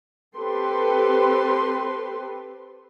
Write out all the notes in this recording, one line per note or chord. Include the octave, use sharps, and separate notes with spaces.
C4 G4 A4 B4 C6